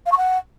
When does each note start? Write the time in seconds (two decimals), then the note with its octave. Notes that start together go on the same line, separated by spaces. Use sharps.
0.06 F5
0.11 C#6
0.17 F#5